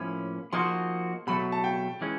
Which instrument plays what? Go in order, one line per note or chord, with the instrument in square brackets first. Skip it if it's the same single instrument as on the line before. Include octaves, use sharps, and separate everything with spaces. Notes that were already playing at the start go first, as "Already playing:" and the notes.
Already playing: [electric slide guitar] A2 F3 A#3 C#4 [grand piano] B5
[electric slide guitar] F3 A#3 D#4 F#4 [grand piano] C6
[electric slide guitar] B2 F#3 A3 [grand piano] B5
[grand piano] A5
G5
[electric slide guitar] E3 G#3 C#4